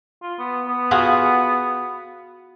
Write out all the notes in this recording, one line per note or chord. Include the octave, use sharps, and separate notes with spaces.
F4
B3
B3
F4 F#4 G#4